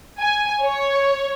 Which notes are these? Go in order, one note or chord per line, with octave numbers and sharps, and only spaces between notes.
G#5
C#5